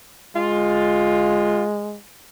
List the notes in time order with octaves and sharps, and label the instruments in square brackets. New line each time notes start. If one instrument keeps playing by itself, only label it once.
[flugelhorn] G#3 [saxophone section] F4